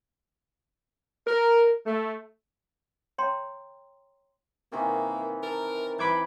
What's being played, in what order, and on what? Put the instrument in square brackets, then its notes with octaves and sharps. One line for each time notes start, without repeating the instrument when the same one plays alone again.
[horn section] A#4
A3
[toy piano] C#5 G5 A#5 C6
[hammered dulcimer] C3 D#3 E3 [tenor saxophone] A#3
[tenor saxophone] A#4 [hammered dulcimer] A5
[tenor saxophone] E3 [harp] B5 D6 G#6